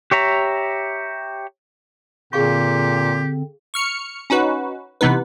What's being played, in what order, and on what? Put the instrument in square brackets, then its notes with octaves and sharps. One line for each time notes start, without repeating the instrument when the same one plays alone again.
[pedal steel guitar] G4 C#5 E5 A#5
[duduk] A#2 [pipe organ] D3 C4 [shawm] G4 [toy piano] G#4 F5 C#6
[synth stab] C#6 F6 C#7
C#4 D#4 F#4 B4
C3 E3 B3 D#4 B4